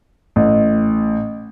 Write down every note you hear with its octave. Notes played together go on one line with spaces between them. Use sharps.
A1